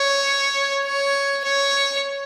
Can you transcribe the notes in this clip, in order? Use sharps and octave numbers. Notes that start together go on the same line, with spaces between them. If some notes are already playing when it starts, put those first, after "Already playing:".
Already playing: C#5
C#5
C#5